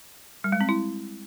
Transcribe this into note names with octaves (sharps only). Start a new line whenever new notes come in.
G3
G#3
C4
E4